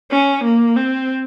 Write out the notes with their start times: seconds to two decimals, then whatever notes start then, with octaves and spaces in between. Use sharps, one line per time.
0.11 C#4
0.44 A#3
0.76 C4